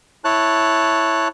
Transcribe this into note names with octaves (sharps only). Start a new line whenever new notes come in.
E4 C#5 A5 F#6